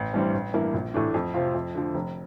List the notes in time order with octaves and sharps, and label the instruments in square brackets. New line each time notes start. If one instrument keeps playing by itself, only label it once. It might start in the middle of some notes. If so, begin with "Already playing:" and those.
Already playing: [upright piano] A1
G2 E3 G3 C4
A1
G2 E3 A#3 E4
A#1
A2 E3 A3 D4
F2
C3 F3 C4 F4
F2
D3 F3
F1